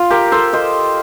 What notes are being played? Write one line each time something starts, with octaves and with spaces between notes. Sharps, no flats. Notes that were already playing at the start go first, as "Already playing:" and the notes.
Already playing: F4
G4 A#4
A4 C5
C5 D#5